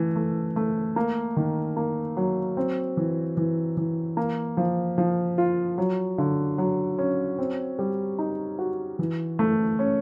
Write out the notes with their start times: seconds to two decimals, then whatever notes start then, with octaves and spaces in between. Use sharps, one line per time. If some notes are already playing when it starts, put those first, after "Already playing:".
Already playing: E3 A3
0.16 A3
0.56 A3
0.96 A#3
1.36 D#3
1.77 A#3
2.17 F#3
2.57 C4
2.97 E3
3.37 E3
3.77 E3
4.17 A#3
4.57 F3
4.98 F3
5.38 F4
5.78 F#3
6.18 D3
6.58 F#3
6.98 C#4
7.39 C4
7.79 G3
8.19 D#4
8.59 F#4
8.99 E3
9.39 A3
9.79 C#4